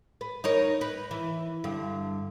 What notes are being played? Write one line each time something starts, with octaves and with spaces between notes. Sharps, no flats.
B4
D#4 A#4 C#5
B4
E3
G2 D3